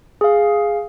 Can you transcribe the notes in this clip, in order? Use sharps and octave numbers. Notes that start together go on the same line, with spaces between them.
G#4 F5